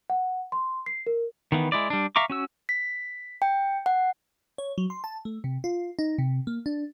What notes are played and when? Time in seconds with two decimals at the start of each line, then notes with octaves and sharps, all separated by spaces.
0.10 F#5
0.52 C6
0.86 C7
1.07 A#4
1.52 D#3 E3 B3
1.72 G#3 E4 D5
1.90 G3 D4
2.16 E5 F5 A#5 C#6 D6
2.30 C#4 F#4 E6
2.69 B6
3.42 G5
3.86 F#5
4.58 C#5
4.78 F#3
4.90 C6
5.04 A5
5.25 A3
5.44 C3
5.64 F4
5.99 D#4
6.18 C3
6.47 A#3
6.66 D4